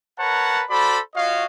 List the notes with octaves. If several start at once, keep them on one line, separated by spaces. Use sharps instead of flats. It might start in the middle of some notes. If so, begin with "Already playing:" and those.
A#4 B4 C#5 F#5 A5 A#5
F#4 A4 C5 D5 B5
F4 F#4 C#5 D#5 F5